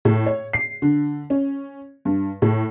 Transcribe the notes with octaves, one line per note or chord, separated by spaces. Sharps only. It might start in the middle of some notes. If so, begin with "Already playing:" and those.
A2
C#5
C7
D3
C#4
G2
A2